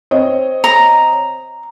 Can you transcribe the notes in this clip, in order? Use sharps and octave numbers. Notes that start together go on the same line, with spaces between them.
C4 C#5 D#5
A#5